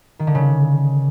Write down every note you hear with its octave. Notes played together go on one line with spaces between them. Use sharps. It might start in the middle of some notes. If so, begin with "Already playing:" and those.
D#3
D3
C#3